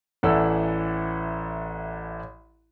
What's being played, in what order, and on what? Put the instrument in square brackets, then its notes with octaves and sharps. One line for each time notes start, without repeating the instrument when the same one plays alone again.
[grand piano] A1 E3 A4 D5 F#5 E6